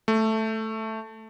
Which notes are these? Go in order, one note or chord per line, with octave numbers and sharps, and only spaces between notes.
A3